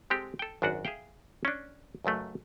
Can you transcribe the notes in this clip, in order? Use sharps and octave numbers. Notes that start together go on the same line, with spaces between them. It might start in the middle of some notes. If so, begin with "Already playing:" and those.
G#3 C4 G4 A4
A4 G5
G#1 F#2 D4 F#4 F#5
G#4 E5 F5 G5
C#4 D4
C#2 F#2 F#3 A3